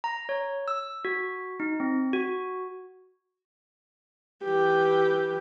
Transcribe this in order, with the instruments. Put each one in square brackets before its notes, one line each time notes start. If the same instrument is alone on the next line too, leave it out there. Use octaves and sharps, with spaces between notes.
[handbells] A#5
C#5
E6
F#4
D#4
C4
F#4
[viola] E3 G4